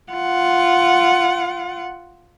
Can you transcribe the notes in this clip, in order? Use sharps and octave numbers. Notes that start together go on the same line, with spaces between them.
F4 F#5